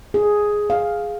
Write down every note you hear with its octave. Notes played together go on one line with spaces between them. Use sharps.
G#4
F5